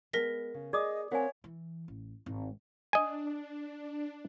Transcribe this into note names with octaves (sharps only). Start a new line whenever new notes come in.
G#3 B3 A#4 A#6 B6
C#3
G#4 D5 D#5 D6 D#6
C4 A#4 C#5 F5 F#5 G#5
E3
A1
G#1
D4 D#5 G#5